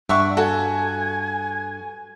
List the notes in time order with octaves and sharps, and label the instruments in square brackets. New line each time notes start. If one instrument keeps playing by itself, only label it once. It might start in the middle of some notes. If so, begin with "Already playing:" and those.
[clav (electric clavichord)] G2 [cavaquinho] D5 F#5 C#6 [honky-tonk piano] E5
[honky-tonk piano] F#4 [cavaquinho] A4 [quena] G#5